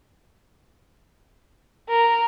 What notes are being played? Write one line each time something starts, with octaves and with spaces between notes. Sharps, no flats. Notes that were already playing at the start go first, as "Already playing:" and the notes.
A#4